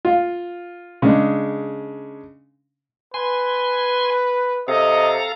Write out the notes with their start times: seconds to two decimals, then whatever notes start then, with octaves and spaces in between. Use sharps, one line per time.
0.05 F4
1.02 C#3 G#3 D4
3.14 B4 G#5 C6
4.68 C3 A4 D#5 F5 A#5